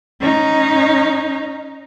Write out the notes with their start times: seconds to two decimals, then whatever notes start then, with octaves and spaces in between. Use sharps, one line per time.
0.20 C#4 D#4